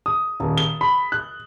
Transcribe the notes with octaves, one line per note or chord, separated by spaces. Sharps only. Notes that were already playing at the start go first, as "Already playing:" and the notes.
D#6
D#1
G7
B5
F#6